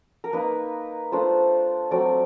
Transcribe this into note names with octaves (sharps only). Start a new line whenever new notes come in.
A#4
A#3 D#4 B4
A3 D4 F4 C5
F#3 A3 C4 D5